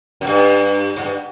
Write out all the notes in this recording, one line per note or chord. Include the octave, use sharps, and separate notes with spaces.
F#2
G2
G#2
G2